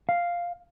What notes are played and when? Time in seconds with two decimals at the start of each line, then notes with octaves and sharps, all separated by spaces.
0.09 F5